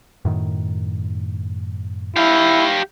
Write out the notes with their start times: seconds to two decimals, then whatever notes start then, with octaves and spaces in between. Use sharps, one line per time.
0.25 F#2 A2 D#3
2.16 E4 G4 F5